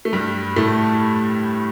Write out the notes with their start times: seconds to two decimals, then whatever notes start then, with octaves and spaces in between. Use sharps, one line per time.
0.05 A3
0.13 G2 G3
0.56 A2 A3